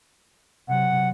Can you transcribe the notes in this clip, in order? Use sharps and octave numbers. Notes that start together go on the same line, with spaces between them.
C3 F#3 F#5